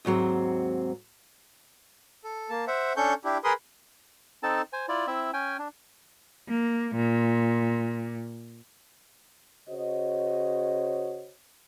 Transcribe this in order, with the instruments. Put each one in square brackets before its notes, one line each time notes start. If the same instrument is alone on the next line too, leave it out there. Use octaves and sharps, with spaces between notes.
[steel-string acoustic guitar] D#2 G#2 F#3 C4
[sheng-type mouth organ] A4
A#3 A5
C5 E5 F#5
C#4 D4 A4 C#6 G6
D4 E4 G4
G#4 A#4 B4 B5 C6 D#6
[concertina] C4 D#4 A4 A5
C5 G#5
E4 F4 D5
C4 E4 E5
C#4 G5 G#5
D4
[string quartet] A#3
A#2
[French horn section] C#3 F#4 C5 C#5 D#5